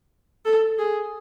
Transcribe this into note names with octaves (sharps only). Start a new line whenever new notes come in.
A4
G#4